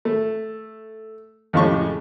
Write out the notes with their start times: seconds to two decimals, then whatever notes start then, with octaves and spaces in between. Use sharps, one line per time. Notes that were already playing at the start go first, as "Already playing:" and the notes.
0.05 A3
1.53 F2 A2 C#3 G#3 G4 C#6